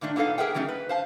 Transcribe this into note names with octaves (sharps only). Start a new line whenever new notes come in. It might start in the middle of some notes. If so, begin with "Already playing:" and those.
A#2 D#3 A3 D4
A#2 B3 D#4 A4 F5
G#4 A#4 B4 E5 F#5 G5
E3 F#3 A3 C#4 D#4
B4
C5 F5 A5